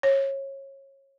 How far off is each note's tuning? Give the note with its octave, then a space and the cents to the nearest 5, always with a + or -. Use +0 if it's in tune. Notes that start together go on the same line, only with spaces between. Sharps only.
C#5 -25